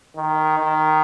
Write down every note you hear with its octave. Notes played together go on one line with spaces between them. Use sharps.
D#3
D#3